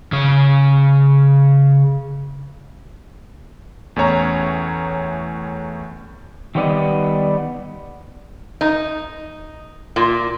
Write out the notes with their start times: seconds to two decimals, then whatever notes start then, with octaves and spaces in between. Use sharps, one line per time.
0.12 C#3 C#5
3.96 E2 A2 C#4 C#5 A#5
6.55 D#3 G3 B3 D5 D#5
8.61 D#4
9.96 A#2